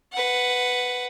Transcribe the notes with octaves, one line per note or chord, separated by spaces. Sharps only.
B4 F#5